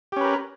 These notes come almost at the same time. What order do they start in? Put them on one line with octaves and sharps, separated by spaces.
G4 C#4 B4 A#4